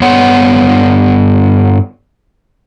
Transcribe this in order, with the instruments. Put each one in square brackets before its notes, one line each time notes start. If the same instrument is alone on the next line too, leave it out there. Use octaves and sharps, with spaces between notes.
[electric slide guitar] G2 B3 C#5 F#5